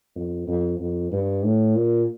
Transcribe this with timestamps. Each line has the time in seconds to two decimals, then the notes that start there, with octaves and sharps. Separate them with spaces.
0.16 F2
0.47 F2
0.80 F2
1.12 G2
1.44 A2
1.76 A#2